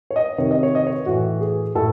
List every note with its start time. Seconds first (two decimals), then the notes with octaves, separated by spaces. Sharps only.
0.10 C#5
0.16 D#5
0.38 C3 D#3 C#5
0.51 D#5
0.63 C#5
0.75 D#5
0.87 C#5
1.06 A2 E3 F#4
1.41 G#4
1.75 A2 A4